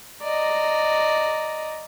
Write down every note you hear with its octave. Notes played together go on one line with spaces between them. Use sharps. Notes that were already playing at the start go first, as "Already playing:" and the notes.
D5 D#5 A#5